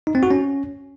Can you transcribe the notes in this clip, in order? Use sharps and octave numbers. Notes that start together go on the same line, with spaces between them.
D#4
C4
F#4
C#4